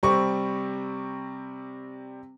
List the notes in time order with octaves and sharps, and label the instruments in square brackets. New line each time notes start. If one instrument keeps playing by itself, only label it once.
[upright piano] C3 G3 C4 C#6